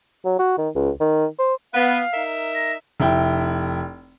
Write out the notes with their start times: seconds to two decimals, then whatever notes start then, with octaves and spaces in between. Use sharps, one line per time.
0.25 F#3
0.39 F#4
0.58 D#3
0.75 C#2
1.00 D#3
1.39 C5
1.73 B3 F5
2.14 D#4 A#4 E5
2.55 A#6
3.00 F1 E4 G5